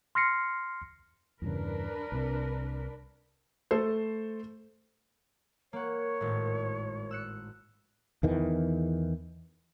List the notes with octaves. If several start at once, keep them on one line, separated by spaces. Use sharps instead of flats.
C6 F6 A#6 C7 C#7
E2 G2 C#3 D4 A#4 B4
C2 C3
A3 A4 C5
A#3 C#5 F#5
G#1 A2
E6 F#6 C#7
E2 D#3 E3